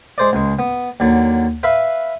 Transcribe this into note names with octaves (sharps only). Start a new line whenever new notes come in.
G#3 C5 D5
C#2 G#3
B3
D#2 D3 F#3
B4 E5 F5 B5